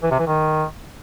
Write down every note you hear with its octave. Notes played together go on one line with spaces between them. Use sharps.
E3
C3
E3
D#3